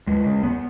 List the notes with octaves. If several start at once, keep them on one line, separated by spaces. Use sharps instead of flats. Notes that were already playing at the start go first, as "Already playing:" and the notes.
D#2 G#3
C#3
D#2 B3